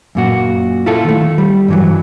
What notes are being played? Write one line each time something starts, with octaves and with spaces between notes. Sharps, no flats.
F#2 A#2 F#4
E4 F4 A4
D#3 A3
G3
G2 E3 F#3